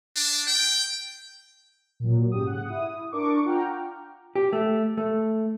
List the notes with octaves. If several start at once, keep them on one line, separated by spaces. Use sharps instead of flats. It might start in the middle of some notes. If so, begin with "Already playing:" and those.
D4
G5
A#2 F#3
G#2 C#3 G4 D#6
F#5
E4 D#6
D4 A#4 C#6 D6
F4 F#5 G5 A#5 F6
G4
A3
A3